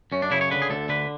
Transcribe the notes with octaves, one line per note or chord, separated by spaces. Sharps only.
F#2 C#4
D4
C#3 E4
C#5
D3 B4
G#4
D2 A4
D3 B4